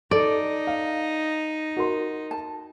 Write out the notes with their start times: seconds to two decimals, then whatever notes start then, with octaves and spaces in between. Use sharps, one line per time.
0.11 D#4 A4 D5 D7
0.67 F5
1.77 F#4 A#4 C6
2.31 A5